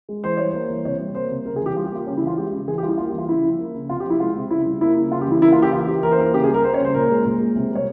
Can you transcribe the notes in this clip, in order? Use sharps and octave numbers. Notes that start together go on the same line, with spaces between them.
G#3
E3 C5
G3 C#5
A#3 C5
E3
C3 C#5
G3
A#3 C5
C3
C#3 A#4
G#4
E3 G4
G3 F4
G4
A#3 F4
C#3 C#4
E4
E3 F4
G#3 G4
C#3
E3 G#4
G4
G3 F4
E4
A#3 F4
G4
E3 F4
C#3 E4
F3
A#3
C#3
C3 F4
G4
F3
E4
G#3 F4
C3
C#3 E4
G3
A#3 E4
C#3
C#3 F4
G4
E3 E4
A#3 E4
F4
C#3 G4
E3 F4
A#3 G4
E3 A#4
C5
A#3 A#4
C#3 G4
G#4
G3
A#4
A#3 C5
C#5
C#3
C5
A#2 A#4
G#3
A#2
G#3
C3
G3 C#5